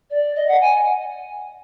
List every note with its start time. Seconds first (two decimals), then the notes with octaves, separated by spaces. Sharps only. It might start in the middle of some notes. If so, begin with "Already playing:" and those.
0.10 D5
0.35 D#5
0.48 F#5
0.60 G#5